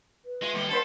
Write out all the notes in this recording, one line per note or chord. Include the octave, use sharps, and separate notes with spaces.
B4
G#3 E4
D#2 G3 G4
G2 A#3 A4 C5